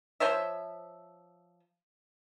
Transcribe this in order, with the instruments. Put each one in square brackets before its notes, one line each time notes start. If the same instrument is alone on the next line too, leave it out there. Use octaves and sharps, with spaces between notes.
[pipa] F3 C5 C#5 E5